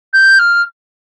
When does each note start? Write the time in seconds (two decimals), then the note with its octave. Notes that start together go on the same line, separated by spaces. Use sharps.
0.13 G6
0.39 F6